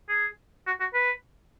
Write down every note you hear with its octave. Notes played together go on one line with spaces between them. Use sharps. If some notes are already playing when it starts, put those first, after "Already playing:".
G#4
F#4
F#4
B4